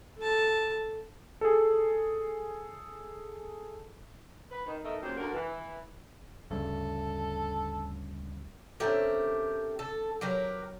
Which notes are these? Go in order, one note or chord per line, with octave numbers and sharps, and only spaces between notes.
A4 A5
G#4 A4
B4
D#3
A3 B3 D#4 A#4 D#5 E5
F#2 A#2 C#3 G4 C5
D2 A#4 F#5
E3
D2 G2 C#3 A4
D3 A3 C4 C#4 G4 A#4
A4
F#3 G4 A#4 B4